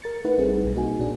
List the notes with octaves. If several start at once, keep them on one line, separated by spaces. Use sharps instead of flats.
A#4 A6 C#7
A3 D#4 E4 B4 F#5
A1 G3 C4 D#4 G#4
B1 B2
A#3 D#4 F#4 G#4 G#5
A#2 D4 G#4